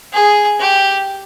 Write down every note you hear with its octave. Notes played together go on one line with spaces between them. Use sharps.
G#4
G4